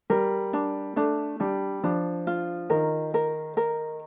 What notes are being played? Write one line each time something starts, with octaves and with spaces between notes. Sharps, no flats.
G3 A#4
D4
A3 D4
G3 D4
F3 D4
F4
D#3 A#4
A#4
A#4